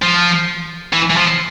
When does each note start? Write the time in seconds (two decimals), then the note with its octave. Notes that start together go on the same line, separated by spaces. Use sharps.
0.02 F3
0.93 E3
1.11 E3
1.17 F3